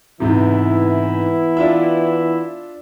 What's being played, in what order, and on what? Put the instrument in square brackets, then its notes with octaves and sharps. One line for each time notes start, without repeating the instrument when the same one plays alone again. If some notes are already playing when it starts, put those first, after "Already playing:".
[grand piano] G#2 C3 [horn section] E3 B3 E4
[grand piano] D4 F4 E5